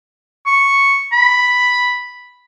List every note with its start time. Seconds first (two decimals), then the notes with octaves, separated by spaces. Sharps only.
0.46 C#6
1.13 B5